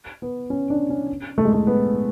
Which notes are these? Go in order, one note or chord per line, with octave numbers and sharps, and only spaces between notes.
B3
C#4
D4
C#4
A3
G#3
A3
B3